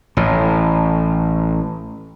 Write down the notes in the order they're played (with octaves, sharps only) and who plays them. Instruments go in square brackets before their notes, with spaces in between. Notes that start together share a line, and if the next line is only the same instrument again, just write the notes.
[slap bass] A1 A2